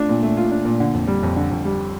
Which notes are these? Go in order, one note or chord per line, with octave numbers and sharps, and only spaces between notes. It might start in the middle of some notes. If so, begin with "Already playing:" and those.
Already playing: A3 D4 F4
A#2
A3
F4
D4
A#2
D3
F2
G3
F2
D3
F2
G3